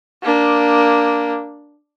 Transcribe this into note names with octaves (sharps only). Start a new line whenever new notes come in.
A#3 D4